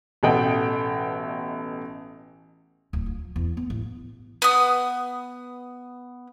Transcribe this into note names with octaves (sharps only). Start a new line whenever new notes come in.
A1 B2 A3 D#5 F#5 G5
D1
F3
E2
B3
A1
B3 D#6